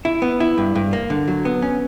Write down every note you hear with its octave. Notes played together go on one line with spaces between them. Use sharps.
E4
B3
E4
G2
G2
A#3
D3
F#3
B3
C#4